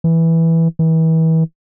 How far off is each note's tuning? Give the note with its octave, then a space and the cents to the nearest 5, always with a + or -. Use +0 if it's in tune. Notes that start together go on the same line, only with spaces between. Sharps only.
E3 -5
E3 -35